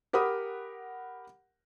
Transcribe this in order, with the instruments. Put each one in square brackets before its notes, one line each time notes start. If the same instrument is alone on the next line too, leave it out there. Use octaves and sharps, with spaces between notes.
[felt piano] G4 A#4 F#5 B5 D#6